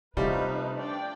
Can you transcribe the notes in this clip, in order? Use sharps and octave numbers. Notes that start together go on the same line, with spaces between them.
C3 F3 G3 A3 C#4 D#4 B4
D4 D5 G5